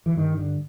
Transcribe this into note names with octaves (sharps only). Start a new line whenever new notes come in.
E3
G2 D#3
D3